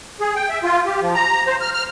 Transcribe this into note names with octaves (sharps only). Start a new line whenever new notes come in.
G#4
G5
E5
F4
G4
F3
A#5
C5
F6
F6